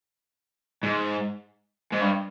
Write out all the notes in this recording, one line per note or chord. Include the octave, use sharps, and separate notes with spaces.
G#2
G#2
G2